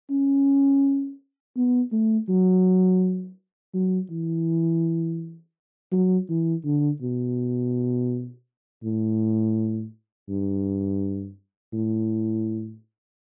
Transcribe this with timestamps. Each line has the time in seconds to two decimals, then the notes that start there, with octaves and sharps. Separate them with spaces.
0.10 C#4
1.57 B3
1.92 A3
2.29 F#3
3.74 F#3
4.10 E3
5.92 F#3
6.29 E3
6.65 D3
7.02 B2
8.83 A2
10.29 G2
11.73 A2